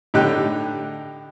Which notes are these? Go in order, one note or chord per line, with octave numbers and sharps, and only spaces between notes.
A2 D3 D#4 G4 F#6